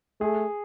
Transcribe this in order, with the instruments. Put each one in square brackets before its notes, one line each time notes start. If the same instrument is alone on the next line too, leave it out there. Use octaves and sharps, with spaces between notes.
[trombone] A3 [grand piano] G#4